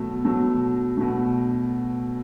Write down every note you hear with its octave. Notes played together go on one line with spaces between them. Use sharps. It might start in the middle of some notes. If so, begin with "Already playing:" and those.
Already playing: B2 F#3 A3
B2 F#3 A3
B2 F#3 A3